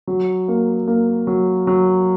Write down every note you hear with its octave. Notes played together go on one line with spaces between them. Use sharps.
F#3
A#3
A#3
F#3
F#3